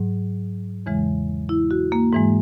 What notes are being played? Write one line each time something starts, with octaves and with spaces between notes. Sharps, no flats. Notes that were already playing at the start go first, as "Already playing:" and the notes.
Already playing: G#2 F#3
E2 C#3 E3 G#3
E4
F#4
A#3
G#2 E3 G#3